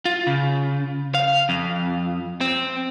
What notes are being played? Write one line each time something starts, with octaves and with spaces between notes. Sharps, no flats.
F4
C#3
F5
F2
C4